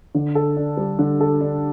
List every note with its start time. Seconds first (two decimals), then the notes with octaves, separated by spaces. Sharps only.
0.15 D3
0.35 A4
0.56 D4
0.77 G3
0.99 D3
1.20 A4
1.41 D4